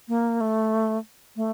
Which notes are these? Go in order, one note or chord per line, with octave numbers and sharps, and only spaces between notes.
A#3
A3
A3